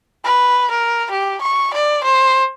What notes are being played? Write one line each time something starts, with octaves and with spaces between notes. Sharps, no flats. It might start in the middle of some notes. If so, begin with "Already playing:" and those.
B4
A#4
G4
C#6
D5
C5